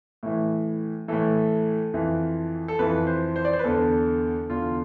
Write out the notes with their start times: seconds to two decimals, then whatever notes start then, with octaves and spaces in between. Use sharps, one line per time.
0.23 A2 E3
1.08 A2 E3 A4
1.94 F2 E3
2.68 A4
2.79 F2 E3 B4
3.07 C5
3.36 C5
3.45 D5
3.53 C5
3.59 B4
3.64 E2 D3 A4
4.50 E2 D3 F4